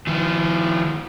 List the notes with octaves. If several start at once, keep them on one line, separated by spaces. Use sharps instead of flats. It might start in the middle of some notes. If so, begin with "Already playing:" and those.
D#3 F3